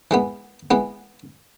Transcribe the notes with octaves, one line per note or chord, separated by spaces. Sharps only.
E3 G#3 B3
E3 G#3 B3